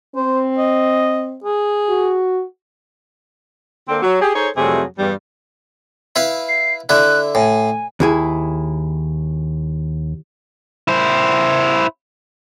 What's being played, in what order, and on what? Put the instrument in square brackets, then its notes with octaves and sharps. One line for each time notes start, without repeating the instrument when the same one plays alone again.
[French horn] C4 [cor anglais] C5
[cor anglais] D#5
G#4
[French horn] F#4
[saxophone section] D3 A#3 C4
F#3
G4 G#4
D#4 G#4 A4 C5 C#5
F2 C3 F#3 G3 A3 G#4
E2 G2 G3
[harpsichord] E4 B4 F5
[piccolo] C7
[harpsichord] D3 E4 [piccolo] F#6
[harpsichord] A2 [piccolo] G#5
[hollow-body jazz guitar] D#2 E4 G#4
[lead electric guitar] E4 C5